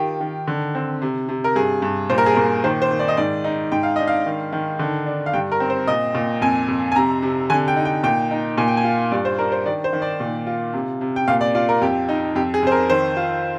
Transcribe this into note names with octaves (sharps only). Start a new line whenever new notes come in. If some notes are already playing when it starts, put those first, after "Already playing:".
Already playing: D#3 F4 G4
D#3
D3
C4
C3
C3
A#4
G2 G#4
G2
A#2 C5
A#4
G#4
A#2 A#4
D#3 C5
C5
D#3
D5
D#5
G#2 D5
D#4
G#2 G5
F5
D4 D#5
F5
D#3
D#3
D3
D4
F5
G2 G5
A#4
C4
C5
A#2 D#5
A#2
F2 G#5
F2
G#5
C3 A#5
C3
D3 G#5
G5
D#4
G5
A#2 G5
D#4
A#2 G#5
G5
G#5
F4
G2 D5
C5
D4 A#4
C5
D#3 D5
C5
D#3
D5
A#2
F4
C3
C3
G5
A#2 F5
D5
F4 D5
A#4
F2 G4
D#4
F2 G4
G#4
F2 C5
A#4
D#3 C5
F4